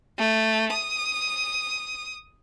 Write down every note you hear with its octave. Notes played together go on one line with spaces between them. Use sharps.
A3
D#6